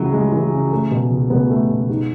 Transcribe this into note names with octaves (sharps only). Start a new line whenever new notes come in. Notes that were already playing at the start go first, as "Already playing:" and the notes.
Already playing: C#2 C#3 E3 F#3
G#3
E3
C#3
A3
B2
C#2
C#2 B3
A3
B2
G#2